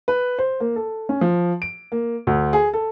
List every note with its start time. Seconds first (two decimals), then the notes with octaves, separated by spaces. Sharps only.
0.08 B4
0.39 C5
0.60 A#3
0.76 A4
1.09 C#4
1.21 F3
1.62 D7
1.92 A#3
2.27 D2
2.53 G#4
2.73 A4